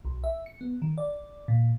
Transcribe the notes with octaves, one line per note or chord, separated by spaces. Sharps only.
B1
E5
C#7
B3
D#3
D5
A#2